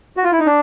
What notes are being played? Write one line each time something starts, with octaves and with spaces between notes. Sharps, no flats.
F#4
F4
E4
D#4
D4